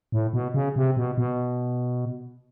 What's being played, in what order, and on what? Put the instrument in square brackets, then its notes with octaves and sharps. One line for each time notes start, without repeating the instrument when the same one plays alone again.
[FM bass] A2
B2
C#3
C3
B2
B2